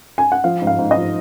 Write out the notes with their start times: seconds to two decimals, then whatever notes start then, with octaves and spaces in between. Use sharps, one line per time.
0.18 G#5
0.32 F#5
0.44 F3 F5
0.62 G#2
0.67 F5
0.79 G#2
0.91 D#5
0.97 F3